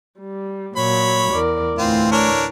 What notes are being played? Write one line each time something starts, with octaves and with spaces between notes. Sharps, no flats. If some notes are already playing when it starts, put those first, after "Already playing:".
G3
A#2 F#3 C#5 B5
E2 A#4 D5
D2 A2 E3 C4 F4
D4 A#4 C#5